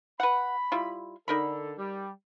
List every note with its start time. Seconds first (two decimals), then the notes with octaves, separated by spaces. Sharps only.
0.20 B4 F#5 B5
0.72 G3 E4 F4
1.28 D3 D#4 A4 A#4 B5
1.78 G3